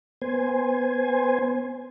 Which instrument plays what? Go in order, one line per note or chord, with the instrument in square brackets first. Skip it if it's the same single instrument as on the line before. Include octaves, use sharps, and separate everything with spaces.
[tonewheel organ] B3 C5 G#5